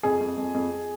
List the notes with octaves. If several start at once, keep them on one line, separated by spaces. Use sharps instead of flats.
F2 G#4
F2
F2
F2